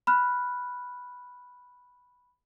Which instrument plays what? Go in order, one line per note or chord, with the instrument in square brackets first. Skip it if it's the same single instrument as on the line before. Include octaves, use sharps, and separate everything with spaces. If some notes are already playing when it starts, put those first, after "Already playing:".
[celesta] B5 F6 F#6